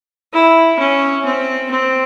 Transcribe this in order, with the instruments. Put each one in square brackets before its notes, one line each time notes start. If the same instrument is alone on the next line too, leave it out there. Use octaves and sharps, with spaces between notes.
[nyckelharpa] E4
C#4
C4
C4